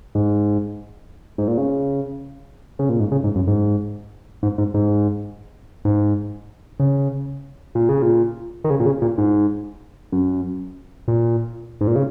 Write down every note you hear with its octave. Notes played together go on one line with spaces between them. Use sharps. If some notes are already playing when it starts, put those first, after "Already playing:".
G#2
G#2
A#2
C#3
C#3
A#2
G#2
C#3
G#2
F#2
G#2
G#2
G#2
G#2
G#2
C#3
A#2
C#3
A#2
D#3
C#3
A#2
C#3
A#2
G#2
F#2
A#2
G#2
A#2
C#3